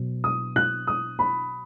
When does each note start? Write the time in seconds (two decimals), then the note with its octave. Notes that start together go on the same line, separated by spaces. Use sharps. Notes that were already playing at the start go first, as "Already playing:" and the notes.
Already playing: B2 F#3
0.24 D#6
0.56 F#6
0.87 D#6
1.19 B5